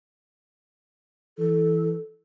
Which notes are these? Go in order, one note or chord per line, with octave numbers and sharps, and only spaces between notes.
E3 A4